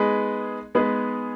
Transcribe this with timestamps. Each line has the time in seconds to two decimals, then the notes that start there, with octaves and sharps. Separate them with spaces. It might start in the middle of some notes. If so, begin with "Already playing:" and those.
Already playing: G#3 B3 D#4 G#4 B4
0.75 G#3 B3 D#4 G#4 B4